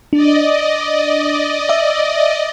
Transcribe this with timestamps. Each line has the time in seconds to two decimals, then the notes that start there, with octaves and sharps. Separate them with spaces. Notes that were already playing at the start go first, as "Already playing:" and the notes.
0.13 D4 D5 D#5
1.69 E5